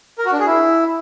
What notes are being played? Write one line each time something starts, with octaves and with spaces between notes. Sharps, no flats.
A#4
F#4
D4
G#4
E4